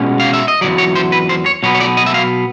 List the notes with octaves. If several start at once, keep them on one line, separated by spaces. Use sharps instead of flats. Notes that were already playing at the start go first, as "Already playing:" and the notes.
Already playing: B2 G#3 C#4
F5
E5
D#5
E2 C#3 F#3 D5
C#5
C5
B4
C5
C#5
B2 F#3 B3 C#5
C#5
D5
D#5
E5
F5